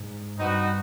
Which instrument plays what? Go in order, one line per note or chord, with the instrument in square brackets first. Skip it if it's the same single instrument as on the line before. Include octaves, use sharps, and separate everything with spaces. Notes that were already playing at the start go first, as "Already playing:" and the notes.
Already playing: [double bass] G#2
[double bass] G2 [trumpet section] C4 D#4 F#4 B4 D#5